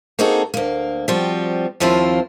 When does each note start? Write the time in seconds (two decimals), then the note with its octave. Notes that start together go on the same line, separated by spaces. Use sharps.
0.19 A#3 C4 D#4 F#4 G#4 A4
0.54 D2 A#3
1.08 F3 G3 C4 F#4
1.80 D#2 F3 C4 E4 F4 C5